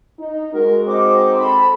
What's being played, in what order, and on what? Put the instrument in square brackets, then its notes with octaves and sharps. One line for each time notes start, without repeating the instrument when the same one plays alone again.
[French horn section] D#4
[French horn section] G#3 F#4 [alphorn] A#4
[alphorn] C4 [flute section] D#4 D6
[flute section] A4 B5